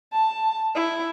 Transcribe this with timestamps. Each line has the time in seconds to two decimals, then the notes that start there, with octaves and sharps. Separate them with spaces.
0.12 A5
0.76 E4